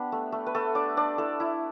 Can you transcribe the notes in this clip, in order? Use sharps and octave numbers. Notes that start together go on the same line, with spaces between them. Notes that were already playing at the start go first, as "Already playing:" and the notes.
Already playing: B3 D4 G4
A3
A3
B4
A3 A4
D4 D5
D4 D5
E4 A4
E4